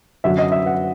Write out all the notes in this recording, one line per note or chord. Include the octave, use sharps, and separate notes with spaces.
F#2 D3 F#3 E5
D#5
E5
F#5